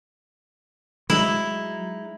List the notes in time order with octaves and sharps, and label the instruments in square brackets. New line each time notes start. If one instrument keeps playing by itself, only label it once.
[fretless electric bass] F#3 [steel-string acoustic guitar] G#3 D#4 [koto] E4